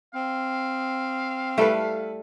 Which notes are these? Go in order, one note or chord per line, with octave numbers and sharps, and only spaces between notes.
C4 F5
G3 A3 E4 A4 B4